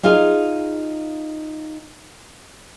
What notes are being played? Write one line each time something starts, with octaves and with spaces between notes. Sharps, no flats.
D#4 F4 G#4 F5